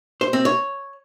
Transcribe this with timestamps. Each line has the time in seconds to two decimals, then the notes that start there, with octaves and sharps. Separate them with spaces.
0.21 C5
0.33 C4
0.45 C#5